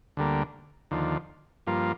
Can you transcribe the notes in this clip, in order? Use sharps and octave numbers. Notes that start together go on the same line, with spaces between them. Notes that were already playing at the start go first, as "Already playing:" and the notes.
D2 D3 G3 A#3
D#2 D3 F3
G2 F3 A#3 F4